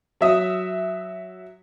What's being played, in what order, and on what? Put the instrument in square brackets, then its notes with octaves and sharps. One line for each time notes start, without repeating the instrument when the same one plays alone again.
[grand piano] F#3 E5 D#6